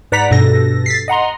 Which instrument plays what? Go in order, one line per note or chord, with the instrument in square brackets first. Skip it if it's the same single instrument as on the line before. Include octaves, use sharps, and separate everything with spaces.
[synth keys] G#2 B4 D5 F#5 A#5 B6
G2 B2 A4 A#6
A6 B6 C7
D#5 F#5 A#5 C6